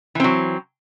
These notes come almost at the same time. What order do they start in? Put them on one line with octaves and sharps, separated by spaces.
E3 C4 F#3